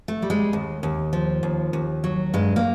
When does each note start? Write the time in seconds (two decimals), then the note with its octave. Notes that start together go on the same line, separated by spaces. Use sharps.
0.08 A3
0.22 G3
0.30 G#3
0.53 D#2
0.83 D#2
1.13 F3
1.43 D#2
1.73 D#2
2.04 F#3
2.34 G2 G#3
2.56 A#3